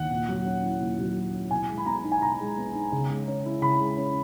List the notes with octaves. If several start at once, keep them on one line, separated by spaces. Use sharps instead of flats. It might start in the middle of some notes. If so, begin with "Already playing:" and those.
Already playing: D#2 F#5
A#2
F#3
C#4
E4
A#2
F#3
C#4
E4
B2 G#5
G#3
B5
B3 A#5
D#4
G#5
B2 A#5
G#3
B3
D#4
C#3
G#3
C#4
E4
C#3 B5
G#3
C#4